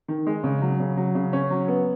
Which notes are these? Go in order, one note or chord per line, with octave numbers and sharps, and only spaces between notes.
D#3
G#3
C#3
F#3
C#3
F#3
C#3
C#4
F#3
B3